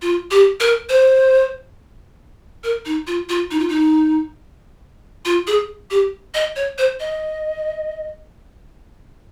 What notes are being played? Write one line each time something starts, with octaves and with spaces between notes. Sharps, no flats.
F4
G4
A#4
C5
A#4
D#4
F4
F4
D#4
F4
D#4
F4
G#4
G4
D#5
C#5
C5
D#5